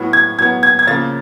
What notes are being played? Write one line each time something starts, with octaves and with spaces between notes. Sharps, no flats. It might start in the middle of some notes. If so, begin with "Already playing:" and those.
Already playing: A2 F#3 B3
G#6
A2 F#3 B3 G#6
G#6
G#6
C#3 F3 A#3 A6